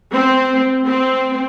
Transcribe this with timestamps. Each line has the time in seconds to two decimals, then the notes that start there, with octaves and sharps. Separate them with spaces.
0.13 C4
0.86 C4